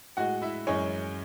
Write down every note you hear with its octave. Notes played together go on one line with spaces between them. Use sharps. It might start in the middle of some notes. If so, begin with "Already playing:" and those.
A2 G#3 F#4 F#5
E4 E5
F#2 E3 G#3 C#4 C#5